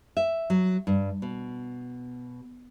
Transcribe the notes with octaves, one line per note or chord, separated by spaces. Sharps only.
E5
F#3
G2
B2